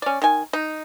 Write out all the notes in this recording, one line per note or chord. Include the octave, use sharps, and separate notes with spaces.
C#4 D5
D#3 G#5
D#4